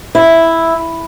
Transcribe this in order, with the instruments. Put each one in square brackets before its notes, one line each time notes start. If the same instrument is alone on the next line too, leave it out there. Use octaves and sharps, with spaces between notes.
[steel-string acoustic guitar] E4